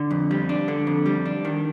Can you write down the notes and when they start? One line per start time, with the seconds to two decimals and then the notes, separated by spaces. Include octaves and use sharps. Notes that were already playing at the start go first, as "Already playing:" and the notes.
Already playing: D3
0.11 F2
0.31 G3
0.49 D4
0.68 D3
0.87 F2
1.06 G3
1.26 D4
1.45 D#3